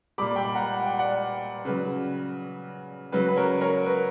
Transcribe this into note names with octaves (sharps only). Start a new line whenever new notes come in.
A#2 G3 B5 D6
G5 B5
F#5 A#5
F#5
G5
D5 F#5
C#3 F#3 B4
C#3 F#3 B4
B4
A#4 C#5
A#4 C#5
B4